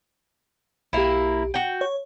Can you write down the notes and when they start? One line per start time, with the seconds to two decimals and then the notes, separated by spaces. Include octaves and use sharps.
0.93 B1 A#3 E4 G4
1.54 F#4 G5
1.81 C#5